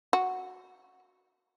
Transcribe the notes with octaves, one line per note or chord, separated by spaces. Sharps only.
F#4